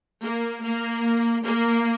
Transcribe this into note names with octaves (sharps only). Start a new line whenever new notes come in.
A#3
A#3
A#3